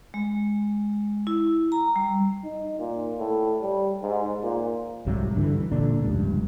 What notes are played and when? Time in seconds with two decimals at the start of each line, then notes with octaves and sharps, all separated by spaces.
0.14 G#3
1.27 E4
1.72 A#5
1.96 G3
2.44 D#4
2.79 A#2
3.19 A2
3.62 G3
4.02 G#2
4.43 A#2
5.06 C2 G#2 C3 F#3
5.35 G2 D3 E3
5.54 E3
5.72 E1 A#2 D3 D4
6.04 F1 C#2 G2